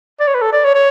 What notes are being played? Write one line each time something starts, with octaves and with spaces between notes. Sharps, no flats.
D5
C#5
B4
A4
D5
C#5
C#5